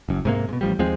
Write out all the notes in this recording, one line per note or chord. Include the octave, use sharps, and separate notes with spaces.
F#1 F#2
G#2 C3 A#3
G#2 B2
A1 F3 G3
D#2 F3 G#3 C4